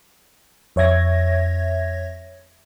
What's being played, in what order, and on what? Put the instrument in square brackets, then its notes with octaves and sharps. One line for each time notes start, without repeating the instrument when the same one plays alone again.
[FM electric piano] F2 C#5 E5 G#6 A#6